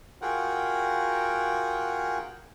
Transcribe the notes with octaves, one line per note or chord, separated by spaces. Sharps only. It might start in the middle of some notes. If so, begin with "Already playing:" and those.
F4 F#4 G#4 A#4 F#5 G5